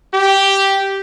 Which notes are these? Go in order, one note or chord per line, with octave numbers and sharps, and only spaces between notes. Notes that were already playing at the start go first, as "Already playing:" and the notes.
G4